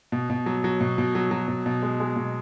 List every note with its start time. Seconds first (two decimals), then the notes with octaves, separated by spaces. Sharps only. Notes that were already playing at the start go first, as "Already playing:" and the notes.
0.12 B2
0.30 B2
0.46 F#3
0.64 F#3
0.81 B2
0.98 B2
1.15 F#3
1.31 F#3
1.48 B2
1.66 B2
1.83 G#3
2.00 G#3
2.16 B2